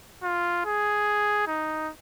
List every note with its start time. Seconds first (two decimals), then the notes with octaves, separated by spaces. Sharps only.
0.23 F4
0.65 G#4
1.47 D#4